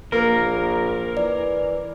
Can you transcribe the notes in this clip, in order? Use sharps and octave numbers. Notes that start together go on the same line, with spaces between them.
A#1 A#3 A#4
E3 D5